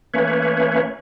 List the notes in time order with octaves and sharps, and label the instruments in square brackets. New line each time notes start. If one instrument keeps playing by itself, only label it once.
[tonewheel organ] E3 A3 A#3 C#4 B4 C#5